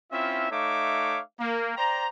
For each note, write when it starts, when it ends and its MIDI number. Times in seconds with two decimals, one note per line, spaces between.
0.12 0.51 60
0.12 0.51 61
0.12 0.51 64
0.12 0.51 65
0.12 0.51 76
0.51 1.20 57
0.51 1.20 63
0.51 1.20 73
0.51 1.20 76
0.51 1.20 77
0.51 1.20 86
1.40 1.72 58
1.76 2.07 72
1.76 2.07 74
1.76 2.07 79
1.76 2.07 82